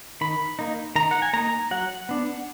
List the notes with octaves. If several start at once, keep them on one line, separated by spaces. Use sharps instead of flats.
D#3 B5
A#3 D#4
D#3 A#5
F#5
G#5
A#3 D#4 A#5
F#3 F#5
B3 D4